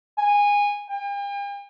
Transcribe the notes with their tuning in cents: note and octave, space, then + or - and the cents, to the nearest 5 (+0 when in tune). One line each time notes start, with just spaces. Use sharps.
G#5 -20
G5 +45